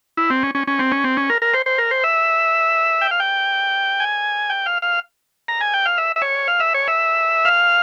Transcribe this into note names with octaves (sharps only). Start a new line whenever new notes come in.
E4
C4
C#4
C#4
C#4
C4
C#4
C4
C#4
A#4
A#4
C5
C5
A#4
C5
E5
G5
F5
G5
G#5
G5
F5
F5
A#5
G#5
G5
F5
E5
E5
C#5
F5
E5
C#5
E5
F5